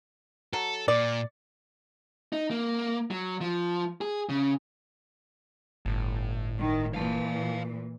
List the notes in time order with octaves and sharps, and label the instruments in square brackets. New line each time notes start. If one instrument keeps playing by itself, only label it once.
[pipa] F#3 [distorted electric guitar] A4
[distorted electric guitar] A#2 [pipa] D5
[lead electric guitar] D#4
A#3
F#3
F3
G#4
C#3
[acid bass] G1 [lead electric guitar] A2
[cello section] D#3
[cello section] A#2 E3 [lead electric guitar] F5 A5